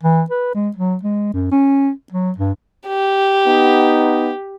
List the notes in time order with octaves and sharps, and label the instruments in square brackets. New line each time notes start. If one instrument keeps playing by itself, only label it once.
[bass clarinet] E3
B4
G#3
F#3
G#3
F#2
C#4
F#3
G2
[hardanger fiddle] G4
[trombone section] B3 D#4